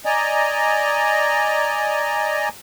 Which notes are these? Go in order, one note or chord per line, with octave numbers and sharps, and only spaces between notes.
D5 D#5 G#5 A#5